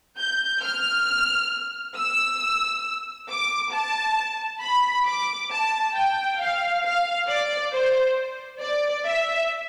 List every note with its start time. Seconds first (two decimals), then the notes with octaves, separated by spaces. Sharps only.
0.18 G6
0.62 F6
1.96 E6
3.29 D6
3.72 A5
4.62 B5
5.06 D6
5.50 A5
5.95 G5
6.40 F5
6.84 F5
7.28 D5
7.72 C5
8.61 D5
9.06 E5